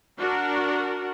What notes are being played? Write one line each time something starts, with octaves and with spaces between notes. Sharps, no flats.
D4 F#4 A#4